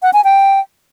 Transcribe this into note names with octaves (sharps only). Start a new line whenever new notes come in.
F#5
G#5
G5